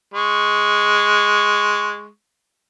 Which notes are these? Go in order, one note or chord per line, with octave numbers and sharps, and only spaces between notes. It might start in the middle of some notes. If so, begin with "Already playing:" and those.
G#3 C#6